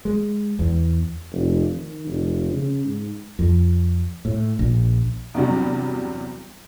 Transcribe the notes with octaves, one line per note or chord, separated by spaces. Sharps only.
G#3
E2
F1
D#3
F1
C#3
G#2
F2
A2
A#1
E2 G2 C3 F#3 G3